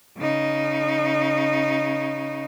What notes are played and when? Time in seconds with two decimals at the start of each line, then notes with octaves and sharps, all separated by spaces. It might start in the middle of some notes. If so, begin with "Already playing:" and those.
0.18 C#3 D#4